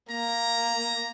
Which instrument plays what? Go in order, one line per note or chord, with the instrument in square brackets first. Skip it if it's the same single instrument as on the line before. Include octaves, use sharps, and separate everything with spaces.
[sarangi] A#3 [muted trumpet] A#5